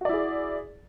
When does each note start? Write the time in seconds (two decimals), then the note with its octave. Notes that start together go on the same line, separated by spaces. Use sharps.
0.01 F#4
0.05 D5
0.09 E4
0.13 G#4